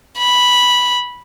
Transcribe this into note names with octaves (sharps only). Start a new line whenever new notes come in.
B5